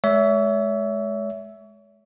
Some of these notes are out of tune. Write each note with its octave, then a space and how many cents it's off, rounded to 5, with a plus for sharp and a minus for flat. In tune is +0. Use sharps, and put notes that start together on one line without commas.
G#3 +25 C#5 +35 E5 +0